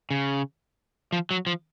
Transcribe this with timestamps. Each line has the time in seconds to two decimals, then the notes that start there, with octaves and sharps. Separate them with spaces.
0.11 C#3
1.12 F3
1.31 F#3
1.47 F3